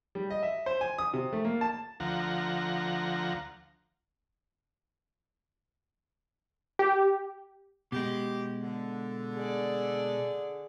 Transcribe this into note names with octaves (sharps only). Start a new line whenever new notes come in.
G3
D#5
E5
C5
G#5
D#6
C3
A3
A#3
A5
D2 F3 F#5 A#5
G4
B2 G#3 G4
D3
G#4 D5